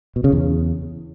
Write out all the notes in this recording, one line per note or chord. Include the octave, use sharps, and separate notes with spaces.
B2
C#3
E2